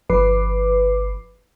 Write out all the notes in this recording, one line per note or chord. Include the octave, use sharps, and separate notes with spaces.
G1 F3 B4 D6 C7